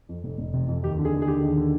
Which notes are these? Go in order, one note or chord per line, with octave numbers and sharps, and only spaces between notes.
F2
F1
F1
C3
F2
D#2 G4
D3
G#4
D#2
G#4
D3 G4
D#2
D3